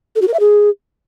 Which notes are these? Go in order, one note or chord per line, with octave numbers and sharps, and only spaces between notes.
A4
F#4
A#4
E5
G#4